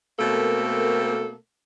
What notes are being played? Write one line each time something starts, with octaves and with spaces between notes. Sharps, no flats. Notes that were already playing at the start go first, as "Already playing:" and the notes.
B2 A3 A#3 C4 A4 A#4